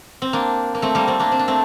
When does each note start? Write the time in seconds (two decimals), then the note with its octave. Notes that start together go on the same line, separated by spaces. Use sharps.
0.22 C4
0.33 A#3 D4
0.75 A#3
0.82 A3 C4
0.95 G3 A#3
1.07 A3 C4
1.20 A#3 D4
1.32 C4
1.39 D4
1.48 A3 C4